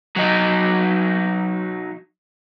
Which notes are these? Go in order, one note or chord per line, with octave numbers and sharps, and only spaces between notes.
F#3 D#4